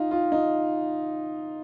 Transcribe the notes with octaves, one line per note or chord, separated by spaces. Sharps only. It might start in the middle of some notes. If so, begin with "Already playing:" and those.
Already playing: D#4 F4
F4
D#4